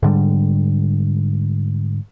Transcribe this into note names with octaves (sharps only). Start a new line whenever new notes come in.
G#2 D3 G3